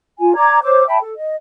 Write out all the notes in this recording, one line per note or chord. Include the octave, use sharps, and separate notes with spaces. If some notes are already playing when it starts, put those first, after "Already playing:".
F4 G#5
D5 A#5 D6 G#6
C5 C#5 D6 E6
E5 G5 A5 B5
A4
D#5